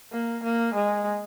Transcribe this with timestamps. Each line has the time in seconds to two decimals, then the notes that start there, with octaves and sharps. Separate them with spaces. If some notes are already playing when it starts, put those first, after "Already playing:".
0.12 A#3
0.44 A#3
0.74 G#3